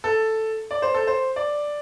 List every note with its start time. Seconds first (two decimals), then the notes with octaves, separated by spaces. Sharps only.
0.04 A4
0.71 D5
0.82 C5
0.94 A4
1.07 C5
1.36 D5